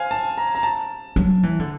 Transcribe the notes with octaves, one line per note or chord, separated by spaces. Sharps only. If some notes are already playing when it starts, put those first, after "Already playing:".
Already playing: C5 F5 G#5
A5
A#5
A#5
A5
F#3
E3
D3